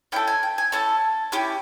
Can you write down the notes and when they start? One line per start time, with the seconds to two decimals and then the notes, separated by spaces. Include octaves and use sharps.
0.12 C#4 E4 A4 G5
0.28 G#5
0.43 G5
0.58 G#5
0.72 C#4 E4 A4 A5
1.32 C#4 E4 G4